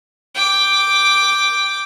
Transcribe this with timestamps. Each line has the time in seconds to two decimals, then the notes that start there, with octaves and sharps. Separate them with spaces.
0.35 G5 D6